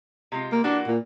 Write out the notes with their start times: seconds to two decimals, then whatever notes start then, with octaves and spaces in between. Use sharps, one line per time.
0.32 C3 G#3 F4
0.52 A#3
0.64 E3 A#3 D4 F#4
0.87 A#2